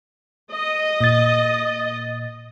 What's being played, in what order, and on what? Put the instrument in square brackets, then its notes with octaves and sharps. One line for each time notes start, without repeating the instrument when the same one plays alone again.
[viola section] D#5
[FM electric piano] A#2 A6